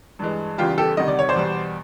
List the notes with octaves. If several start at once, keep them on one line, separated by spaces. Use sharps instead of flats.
G2 E3 G#3
E2 C#3 E3 G3 F4 G4
G4 A4
D2 C3 D#3 G3 D#5
D5
C#5
C5 D5
E2 B2 G3